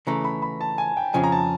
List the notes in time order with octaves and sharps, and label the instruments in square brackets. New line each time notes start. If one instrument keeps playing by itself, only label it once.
[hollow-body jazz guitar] C#3 E3 A3 [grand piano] A#5
[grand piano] B5
B5
A5
G#5
G5
[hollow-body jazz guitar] F2 C#3 F3 [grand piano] G#5
[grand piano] A#5
A5